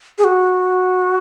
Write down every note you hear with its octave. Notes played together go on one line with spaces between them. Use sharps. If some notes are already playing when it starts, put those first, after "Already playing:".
G#4
F#4